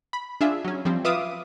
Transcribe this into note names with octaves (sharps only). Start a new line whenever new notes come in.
B5
D4 F4 G#4 E5
F#3 C#4
F3 G3 C4
F4 B4 E5 F5 D6 D#6